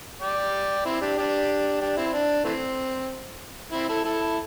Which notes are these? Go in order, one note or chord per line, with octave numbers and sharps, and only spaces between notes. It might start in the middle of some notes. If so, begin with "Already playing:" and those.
D5 G5
C4 E4
D4 G4
D4 G4
D4 G4
C4 E4
D4
E3 A3 C4
C4 E4
E4 A4
E4 A4